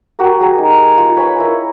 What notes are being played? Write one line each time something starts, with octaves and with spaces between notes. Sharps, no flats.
F#4 G4 A#4
G3 G#4 A#5
D#4
F4
B4 C#5 G#5 B5
E4 A#4